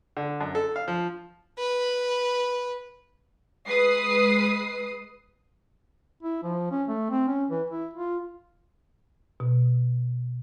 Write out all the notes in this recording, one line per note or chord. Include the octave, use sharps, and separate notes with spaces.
D3
F#2
A4
F5
F3
B4
G#3 B4 D#6 C7
E4
F3
C#4
A3
C4
C#4
E3
E4
F4
B2